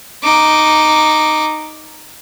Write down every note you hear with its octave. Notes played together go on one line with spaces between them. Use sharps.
D#4 D6